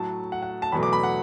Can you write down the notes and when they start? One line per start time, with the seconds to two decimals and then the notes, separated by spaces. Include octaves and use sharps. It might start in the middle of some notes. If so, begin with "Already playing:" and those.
Already playing: A2 F#3 A3 A5
0.32 F#5
0.42 F#5
0.62 A5
0.72 E2 B2 F#3 A3 B5
0.83 D6
0.93 B5
1.03 F#5